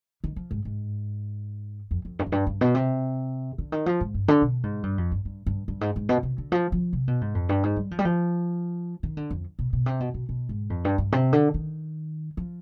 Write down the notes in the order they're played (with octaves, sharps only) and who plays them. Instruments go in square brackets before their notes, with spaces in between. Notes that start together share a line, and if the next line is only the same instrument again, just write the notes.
[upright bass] D#3
F3
G#2
G#2
F2
F2
G2
F2
G2
G2
B2
C3
D3
D#3
F3
G#2
G2
D3
B2
G#2
G2
F2
G2
G2
G2
G2
G#2
G#2
B2
C3
D3
F3
F3
C3
B2
G#2
F2
G2
G#2
G3
F3
G3
F3
D#3
D3
F2
B2
B2
C3
B2
B2
B2
G#2
F2
G2
G2
C3
D3
D#3
F3